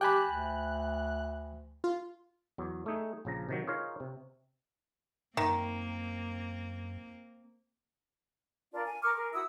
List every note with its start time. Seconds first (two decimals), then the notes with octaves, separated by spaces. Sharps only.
0.01 G4 G5 G#5 B5 F#6
0.27 D2
1.84 F4
2.58 E2 F#3
2.86 A3 D#4 G#4
3.25 A#1 C#3 F3 A#5
3.49 C3 D#3 F#3
3.67 D#4 F4 G#4 A#4 C#5 F5
4.00 C3
5.37 F#2 D#3 A#3 C4
8.72 D4 F4 A#4
8.85 G#5
9.02 A#4 C#6 D6 F6
9.16 G#4 A#4
9.33 E4 F#4 D#6 E6